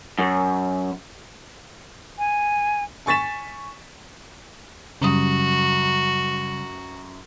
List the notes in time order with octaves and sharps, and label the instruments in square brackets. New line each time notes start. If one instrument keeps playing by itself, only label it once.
[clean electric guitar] F#2
[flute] G#5
[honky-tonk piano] G#5 C#6 A6 B6 E7
[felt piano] F#2 D#6 [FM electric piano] C#3 G3 [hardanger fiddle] F#4